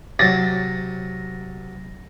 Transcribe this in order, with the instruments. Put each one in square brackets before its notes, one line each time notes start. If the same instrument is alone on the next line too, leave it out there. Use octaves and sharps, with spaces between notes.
[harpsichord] C3 F#3 [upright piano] A6 A#6